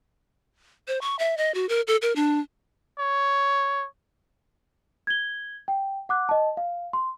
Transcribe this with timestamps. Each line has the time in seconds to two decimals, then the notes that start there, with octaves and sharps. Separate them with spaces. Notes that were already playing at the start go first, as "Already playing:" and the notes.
0.88 C5
1.01 C#6
1.19 E5
1.37 D#5
1.54 F#4
1.69 A#4
1.87 A4
2.02 A#4
2.16 D4
2.99 C#5
5.07 G#6 G7
5.68 G5
6.09 F#5 D6 F#6
6.29 D#5 A5
6.57 F5
6.93 C6